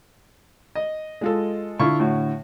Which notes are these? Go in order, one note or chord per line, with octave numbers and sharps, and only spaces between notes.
D#5
G#3 F4 A4
D3 E4 F4 C#6
A2 F#4